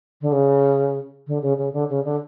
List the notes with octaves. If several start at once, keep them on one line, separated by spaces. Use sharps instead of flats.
D3
C#3
D3
C#3
C#3
D3
C#3
D3